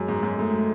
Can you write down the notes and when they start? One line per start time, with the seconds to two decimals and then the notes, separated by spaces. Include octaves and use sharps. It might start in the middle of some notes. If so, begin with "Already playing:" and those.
Already playing: F#2 G#3
0.08 G#2
0.23 F#2
0.38 G#2 A3